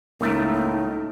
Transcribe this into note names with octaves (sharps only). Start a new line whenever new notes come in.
C#2 A2 A3 A#3 D#4 A#4